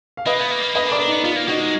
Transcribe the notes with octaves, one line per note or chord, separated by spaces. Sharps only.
F5
A#3 B4 D#5
B3
A#3
A#3
A#3 B4 D#5
D4
A#4 D5
D4
B3 D#4
B3 F4
A#3
A#3 D#4 F#4
G#3